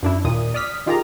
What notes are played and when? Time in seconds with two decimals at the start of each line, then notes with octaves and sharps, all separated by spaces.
0.03 F#2 D4 E4
0.25 D#2 A#2 D#6
0.54 D5 D#6 F6 B6
0.86 D#3 F4 G4 G#4 A#5